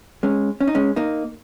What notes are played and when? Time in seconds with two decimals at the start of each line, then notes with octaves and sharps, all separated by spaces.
0.23 G#3 C#4
0.61 C#4
0.67 D#4
0.75 G#3 C#4
0.96 A#3 D#4